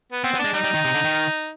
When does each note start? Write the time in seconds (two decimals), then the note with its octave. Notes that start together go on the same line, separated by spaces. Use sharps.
0.12 B3
0.24 B3 C4
0.34 B3
0.39 D4
0.45 G#3
0.53 G3 D#4
0.64 G3
0.74 D#3
0.85 C3
0.94 D3
1.04 D#3